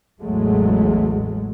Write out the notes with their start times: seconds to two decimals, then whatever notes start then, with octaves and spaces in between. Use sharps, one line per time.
0.20 A1 E2 A2 F#3 G#3 A3